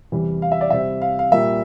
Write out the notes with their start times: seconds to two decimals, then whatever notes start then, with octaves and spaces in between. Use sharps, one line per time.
0.12 E2 C3 E3 G3
0.42 F5
0.52 E5
0.61 D5
0.70 C3 G3 C4 E5
1.02 F5
1.19 F5
1.32 A#2 G3 A#3 E5